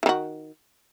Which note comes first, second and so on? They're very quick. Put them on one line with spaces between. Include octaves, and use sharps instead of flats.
E3 D#3 F#4